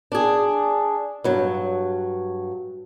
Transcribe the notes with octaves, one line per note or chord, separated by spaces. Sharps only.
D4 G#4
G2 F#3